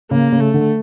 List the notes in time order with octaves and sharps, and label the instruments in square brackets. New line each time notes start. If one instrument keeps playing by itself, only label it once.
[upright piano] C#3 [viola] A#3
[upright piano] C#3
[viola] A3
[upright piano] D3